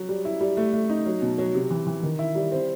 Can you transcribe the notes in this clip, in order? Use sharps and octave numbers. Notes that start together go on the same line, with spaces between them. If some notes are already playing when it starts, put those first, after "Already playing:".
Already playing: F#3
G3
E4
G3
A3
A3
D#4
F#3
B2
F#3
C3
E3
E3
D#3
E4
G3
C4